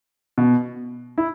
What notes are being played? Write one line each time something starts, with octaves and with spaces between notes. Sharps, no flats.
B2
E4